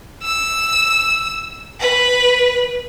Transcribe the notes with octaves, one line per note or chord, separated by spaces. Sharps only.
E6
B4